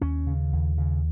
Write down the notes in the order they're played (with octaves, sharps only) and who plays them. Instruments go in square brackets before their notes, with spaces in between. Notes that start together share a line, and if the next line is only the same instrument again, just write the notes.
[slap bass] D#2 C#4
C#3
D#2
C#3